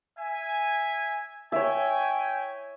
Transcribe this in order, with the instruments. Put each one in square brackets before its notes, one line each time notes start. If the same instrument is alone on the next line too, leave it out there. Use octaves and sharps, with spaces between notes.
[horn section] E5 G#5
[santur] C#5 E5 [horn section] G5 G#5